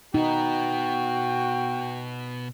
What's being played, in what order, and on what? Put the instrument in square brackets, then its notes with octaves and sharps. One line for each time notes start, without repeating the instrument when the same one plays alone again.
[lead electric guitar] B2 B3 [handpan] D#4 [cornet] F#4 [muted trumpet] G5